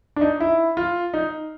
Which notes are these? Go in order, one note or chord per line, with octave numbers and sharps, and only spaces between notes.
D4
D#4
E4
F4
D#4